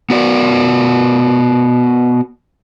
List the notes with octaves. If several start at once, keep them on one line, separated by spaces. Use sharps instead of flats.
B3 F#4 D5